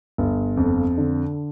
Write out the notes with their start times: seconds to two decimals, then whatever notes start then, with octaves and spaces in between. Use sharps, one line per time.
0.18 G1
0.57 F2
0.98 D3